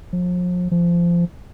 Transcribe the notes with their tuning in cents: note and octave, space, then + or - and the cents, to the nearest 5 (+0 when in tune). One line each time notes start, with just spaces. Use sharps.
F3 +40
F3 -20